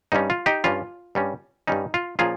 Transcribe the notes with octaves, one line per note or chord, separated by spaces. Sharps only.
G2 G3 C#4 D#4
F4
D#4 G4
G2 G3 C#4 F4
G2 G3 C#4
G2 G3 C#4 D#4
F4
A#2 F3 A#3 C#4 F4 G#4